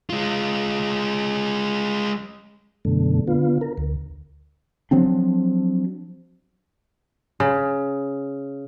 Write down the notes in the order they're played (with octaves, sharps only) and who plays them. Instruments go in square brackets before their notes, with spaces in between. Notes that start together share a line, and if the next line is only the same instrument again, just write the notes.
[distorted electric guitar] G#3 F4
[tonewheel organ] F#2 B2 D3 A3
D3 B3 F4
A#4
D2
[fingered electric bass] F3 F#3 C4 D4
[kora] C#3